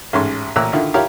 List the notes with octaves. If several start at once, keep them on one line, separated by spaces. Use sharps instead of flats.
A1 G#2 C#4 C6
A1 A#2 A#5 E6 F#6
D3 D#3 E4 F4
E4 F4 G4 A#4 C#5 F5